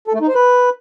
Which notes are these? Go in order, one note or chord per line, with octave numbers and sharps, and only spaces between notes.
A4
A3
D#4
C5
B4